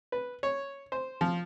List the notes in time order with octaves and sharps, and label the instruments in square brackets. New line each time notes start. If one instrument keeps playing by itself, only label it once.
[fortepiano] B4
C#5
C5
F3